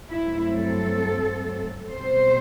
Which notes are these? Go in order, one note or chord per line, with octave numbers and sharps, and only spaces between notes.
G2 F#3 A3 C4 E4
A4
B2 G3 C4 C5